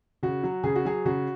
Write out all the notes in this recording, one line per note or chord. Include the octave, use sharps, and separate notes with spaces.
C#3 F#4
F#3
C#3 G#4
F#4
F#3 G#4
C#3 F#4